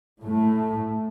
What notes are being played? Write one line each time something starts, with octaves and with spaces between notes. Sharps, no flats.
A2 A3